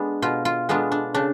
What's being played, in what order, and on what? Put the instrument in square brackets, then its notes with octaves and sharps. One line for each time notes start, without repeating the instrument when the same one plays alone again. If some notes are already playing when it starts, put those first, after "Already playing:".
Already playing: [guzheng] G#3 B3 D4
B2 F4
F4
G#3 B3 D4 F4
D4
C#3 D4